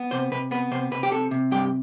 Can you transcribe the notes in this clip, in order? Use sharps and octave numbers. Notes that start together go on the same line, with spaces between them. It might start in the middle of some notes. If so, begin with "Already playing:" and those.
Already playing: B3
C3 C5
C3 B4
B3 B4
C3 C5
C3 B4
G4
C3 A4
C3
G2 G4